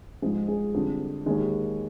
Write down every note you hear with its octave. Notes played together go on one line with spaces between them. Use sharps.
G#2 F3 G#3 G#4
G#4
F2 D3 G3
D#2 D#3 G#3